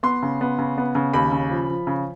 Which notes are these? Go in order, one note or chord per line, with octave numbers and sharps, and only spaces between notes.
B3 C6
C#3
B3
C#3
B3
C#3
D#2 B5
C#3
F3
F3
C#3